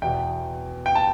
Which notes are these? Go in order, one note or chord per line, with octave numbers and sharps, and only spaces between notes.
E2 B2 G5
G5
A5